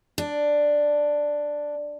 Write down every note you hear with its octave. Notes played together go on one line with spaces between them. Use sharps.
D4